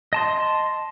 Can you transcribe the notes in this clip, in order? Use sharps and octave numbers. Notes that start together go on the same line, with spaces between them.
D#5 A5 C6